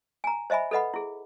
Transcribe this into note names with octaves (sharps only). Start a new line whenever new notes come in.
G#5 A#5
C5 D#5 E5 G#5 B5
A4 B4 D#5 F#5 B5
E4 G#4